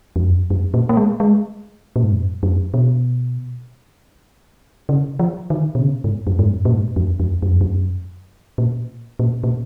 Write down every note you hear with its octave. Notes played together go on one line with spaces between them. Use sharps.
F2
F#2
F#2
A#2
A#3
G#3
G#3
A#2
G#2
F#2
F#2
B2
C#3
F3
D#3
B2
C#3
G#2
F#2
G#2
F#2
A#2
G#2
F2
F2
F#2
F2
F#2
A#2
A#2
A#2